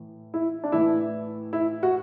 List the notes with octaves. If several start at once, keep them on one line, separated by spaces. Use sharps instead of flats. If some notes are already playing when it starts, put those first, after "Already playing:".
Already playing: A2 E3
E4
D4
A2 E3 E4
E4
F#4